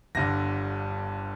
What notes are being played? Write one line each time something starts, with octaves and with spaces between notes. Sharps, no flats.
G1 G2 D3 A#6